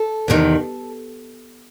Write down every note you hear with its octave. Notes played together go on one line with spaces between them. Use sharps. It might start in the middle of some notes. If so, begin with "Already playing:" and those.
Already playing: A4
E2 C3 D#3